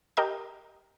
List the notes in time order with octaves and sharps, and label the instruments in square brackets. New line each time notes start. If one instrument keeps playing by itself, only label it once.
[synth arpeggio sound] G4 A#4 D#5 A#5 G6